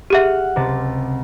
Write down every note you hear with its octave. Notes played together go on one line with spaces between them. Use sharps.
G4 G#4 E5 F#5 F6
C#2 C3 A6